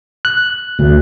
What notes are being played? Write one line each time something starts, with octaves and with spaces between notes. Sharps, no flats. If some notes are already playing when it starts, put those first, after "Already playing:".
F#6
D2